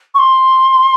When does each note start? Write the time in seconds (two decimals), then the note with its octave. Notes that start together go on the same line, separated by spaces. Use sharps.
0.15 C#6
0.19 C6